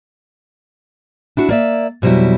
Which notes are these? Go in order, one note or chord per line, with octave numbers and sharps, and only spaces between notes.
D4 E4 F#4
A#3 D5 E5
F2 B2 F#3 G3 E4